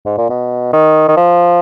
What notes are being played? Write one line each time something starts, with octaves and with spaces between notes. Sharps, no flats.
G#2
A#2
B2
D#3
D#3
F3